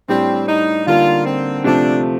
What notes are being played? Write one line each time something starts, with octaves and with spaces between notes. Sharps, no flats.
A2 G3 C4 D4 G4 C5
D#4
D3 G3 A#3 D#4 F4
C4
C3 F3 A3 C4 D4